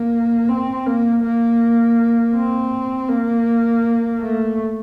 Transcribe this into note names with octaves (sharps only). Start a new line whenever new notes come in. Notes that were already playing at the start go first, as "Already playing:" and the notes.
Already playing: A#3
C4
A#3
A#3
C4
A#3
A3